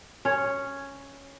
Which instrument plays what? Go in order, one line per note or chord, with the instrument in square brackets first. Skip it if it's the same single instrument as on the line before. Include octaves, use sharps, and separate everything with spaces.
[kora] C#4 C#5